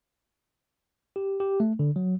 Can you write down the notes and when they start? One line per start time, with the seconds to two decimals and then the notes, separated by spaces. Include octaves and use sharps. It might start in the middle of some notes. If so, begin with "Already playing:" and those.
1.16 G4
1.40 G4
1.60 A3
1.79 D3
1.96 F#3